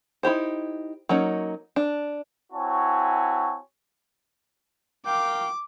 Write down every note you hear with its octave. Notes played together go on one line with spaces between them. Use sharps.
D#4 E4 G4 C5
F#3 A#3 C#4 D#4
D4
C4 E4 F#4 C#5 G#5 A5
A#4 F5 G5 D6